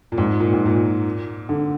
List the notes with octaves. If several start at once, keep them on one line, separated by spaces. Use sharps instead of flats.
A#2
G#2
A#2
G#2
A#2
D3